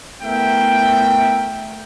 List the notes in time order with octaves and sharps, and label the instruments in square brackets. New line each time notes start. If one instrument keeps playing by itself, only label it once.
[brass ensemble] A3 B3 E4 A#4 E5 G5